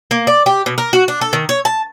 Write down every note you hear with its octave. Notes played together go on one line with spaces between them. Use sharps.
A#3
D5
G4
B2
A#4
F#4
D4
A4
D#3
C#5
A5